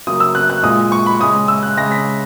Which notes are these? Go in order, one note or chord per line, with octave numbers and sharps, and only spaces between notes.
C#3 F#3 A#3 D#6
E6
F#6
F#6
A#2 G#3 D#6
C#6
B5
C#3 G#3 D#6
E6
F#6
C#3 G#3 A#6
B6